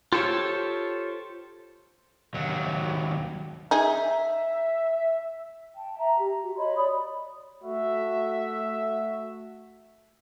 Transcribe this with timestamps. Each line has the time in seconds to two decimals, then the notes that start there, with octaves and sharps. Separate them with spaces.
0.13 F4 G4 A4 C5 C#5
2.34 D#2 F#3
3.71 D#4 G#4 E5
5.75 G5 A5
5.98 E5 A#5
6.19 G4
6.43 F#4
6.57 C#5 D#5 B5 C6
6.76 C#5 D5 B5 D#6
7.64 A3 F#4 E5